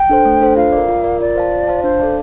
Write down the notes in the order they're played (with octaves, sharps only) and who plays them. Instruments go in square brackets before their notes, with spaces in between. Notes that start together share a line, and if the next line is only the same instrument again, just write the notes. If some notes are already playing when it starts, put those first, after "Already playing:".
Already playing: [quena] G5
[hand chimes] D4 A4 C5
A3
D4 A4 C5
[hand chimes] F4 [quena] F5
[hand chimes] A#4 D5
F4
A#4 D5
[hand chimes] F4 [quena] D5
[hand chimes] C5 F5 A5
F4
C5 F5 A5
[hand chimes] D4 [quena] C5
[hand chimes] A4 D5 F5 A5